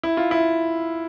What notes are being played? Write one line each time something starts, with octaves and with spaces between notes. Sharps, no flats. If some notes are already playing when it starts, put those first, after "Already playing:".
E4
F4
E4